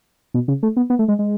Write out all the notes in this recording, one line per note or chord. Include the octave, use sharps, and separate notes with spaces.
B2
C#3
A3
B3
B3
A3
G#3
G#3